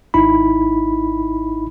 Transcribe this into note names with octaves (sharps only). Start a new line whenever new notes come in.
G#1 D#4 E4 B5